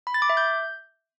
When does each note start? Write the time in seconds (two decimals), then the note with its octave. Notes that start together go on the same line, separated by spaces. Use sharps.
0.07 B5
0.14 A6
0.22 D6
0.30 E5
0.37 G6